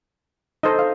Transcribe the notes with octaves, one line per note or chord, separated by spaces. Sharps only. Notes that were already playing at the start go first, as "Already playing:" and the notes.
D#4 A4 C5 D#5
F5